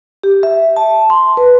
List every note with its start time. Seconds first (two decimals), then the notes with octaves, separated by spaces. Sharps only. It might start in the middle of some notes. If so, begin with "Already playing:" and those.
0.23 G4
0.43 E5
0.76 A5
1.10 C6
1.37 B4